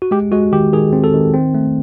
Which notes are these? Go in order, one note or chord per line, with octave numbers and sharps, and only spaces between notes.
F#4
G#3 G4
G#3 F#4
D#3 G4
D#3 G#4
C4
A4
D#3
C4
A3